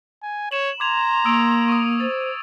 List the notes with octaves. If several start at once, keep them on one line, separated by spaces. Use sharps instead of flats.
G#5
C#5 E7 F#7
A#5 C6 D6 G#6 F7
A#3 D#6 E6 D7
C#6 D#6
C5 A6